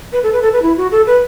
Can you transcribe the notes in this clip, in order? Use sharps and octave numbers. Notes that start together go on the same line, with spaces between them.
B4
A4
B4
A4
B4
E4
F#4
A4
B4